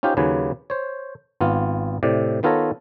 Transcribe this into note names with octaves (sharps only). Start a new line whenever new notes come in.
C#4 D#4 F4 G4 C5
D#2 C#3 F#3 B4 G#5
C5 C#5
G#1 B3 F4
A2 C3 D5
D#3 B3 F4 A4 C#5 A#5